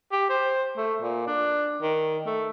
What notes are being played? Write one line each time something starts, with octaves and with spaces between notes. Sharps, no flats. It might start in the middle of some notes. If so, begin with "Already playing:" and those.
G4
C5
A3
A#2
D4
D#3
A3